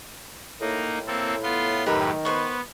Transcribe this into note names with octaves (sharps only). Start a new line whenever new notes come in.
A2 A#3 D#4
A#3 C4 A4
B3 F4 C6
F#2 A2 D#3 G4 A#4 B4
B3 B4 C5 C#6